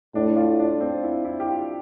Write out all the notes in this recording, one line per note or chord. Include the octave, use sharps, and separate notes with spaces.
A2 D4
F4
D4
C4
E4
E4
G4
F4